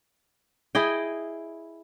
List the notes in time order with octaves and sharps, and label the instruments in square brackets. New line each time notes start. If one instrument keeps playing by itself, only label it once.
[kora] E4 G#4 D#5 G5